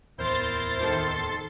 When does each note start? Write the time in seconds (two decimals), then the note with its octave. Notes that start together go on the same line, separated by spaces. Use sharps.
0.18 D1 E2 E4 A#4 C5 C6 A6
0.79 D#3 A4